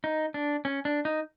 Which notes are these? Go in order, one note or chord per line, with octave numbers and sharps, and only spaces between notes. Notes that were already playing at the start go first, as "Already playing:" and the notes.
D#4
D4
C#4
D4
D#4